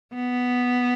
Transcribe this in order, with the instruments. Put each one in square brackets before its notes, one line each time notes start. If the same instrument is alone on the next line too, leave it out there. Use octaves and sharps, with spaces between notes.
[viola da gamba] B3